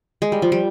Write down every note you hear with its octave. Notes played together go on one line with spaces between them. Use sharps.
G#3
G3
F3
G3